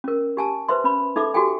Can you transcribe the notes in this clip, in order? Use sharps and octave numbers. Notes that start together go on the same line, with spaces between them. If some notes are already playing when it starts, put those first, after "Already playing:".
C#4 A#4
G4 G#5 A5
B4 C5 E5 C6
C#4 B5
D#4 A4 E5 D6
F#4 G4 A4 G5 G#5